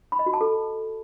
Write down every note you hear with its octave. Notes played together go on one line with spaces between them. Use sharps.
B5
D#5
F#4
A5
A4